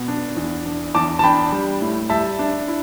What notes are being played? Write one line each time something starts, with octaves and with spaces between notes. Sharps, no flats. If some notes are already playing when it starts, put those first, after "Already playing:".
Already playing: B2
D4
E2
D4
E2 A5 D6
A5
D4 G5 B5
G3
A2
G3 E5 A5
D4
E4